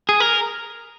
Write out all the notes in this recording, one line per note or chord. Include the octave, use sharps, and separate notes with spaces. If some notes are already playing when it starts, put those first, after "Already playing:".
G#4
A#4